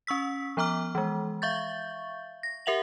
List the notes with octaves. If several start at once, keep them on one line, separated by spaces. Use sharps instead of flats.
C#4 C#6 E6 B6
F3 B3 A#5 D6 F6
E3 G#3
E5 F5 C#6 G6 A6
A#6
G4 A#4 E5 F#5 F7 F#7